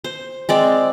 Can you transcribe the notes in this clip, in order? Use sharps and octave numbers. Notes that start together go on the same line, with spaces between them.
C5
G#3 C4 D5